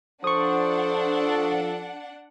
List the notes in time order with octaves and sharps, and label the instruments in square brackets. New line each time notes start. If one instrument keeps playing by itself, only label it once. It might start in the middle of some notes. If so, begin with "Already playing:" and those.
[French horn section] F3 A4 [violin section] D4 F#5 [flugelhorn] C5 [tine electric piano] C#6 D#6